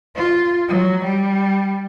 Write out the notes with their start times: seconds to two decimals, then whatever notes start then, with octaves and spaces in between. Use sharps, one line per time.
0.15 F4
0.69 F#3
1.05 G3